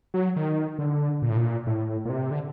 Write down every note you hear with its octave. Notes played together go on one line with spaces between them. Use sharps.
F#3
D#3
D3
A#2
A2
A#2
A2
A#2
C3
D3